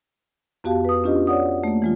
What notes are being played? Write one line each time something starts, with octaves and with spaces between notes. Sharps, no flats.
F2 B3 F#4 G4 F5 A5
B4 D#6
C#4 D4 F4 G4 D#5
C#5 D5 F#5 D#6
A3 A#3
E3 G#3 F4